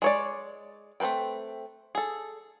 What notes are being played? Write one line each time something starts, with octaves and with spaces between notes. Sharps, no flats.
G#3 C#5 D5
A3 C4 A4 B4 G5
G#4 A4